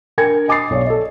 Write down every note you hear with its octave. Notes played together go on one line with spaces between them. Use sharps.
D4 A#4 G5 G#5 G#6 C#7
D#5 G#5 D6 D#6 A6 C7
B1 C#5 D5 F5
A4 D#5